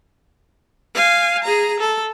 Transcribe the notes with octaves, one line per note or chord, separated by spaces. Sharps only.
F5 G#5
G#4 A#5
A4